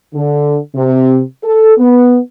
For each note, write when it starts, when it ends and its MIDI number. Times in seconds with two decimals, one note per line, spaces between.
0.14 0.57 50
0.75 1.21 48
1.44 1.73 69
1.78 2.19 59